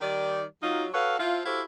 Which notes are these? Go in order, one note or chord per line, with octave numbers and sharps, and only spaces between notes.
D#3 G3 D5
F#3 D#4 F4
F#4 A4 B4 C#5 F5
F3 E4 F4
E4 F#4 G4 A4 C5 F5